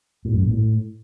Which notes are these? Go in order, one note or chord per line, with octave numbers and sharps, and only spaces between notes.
A2
F#2
A#2
A2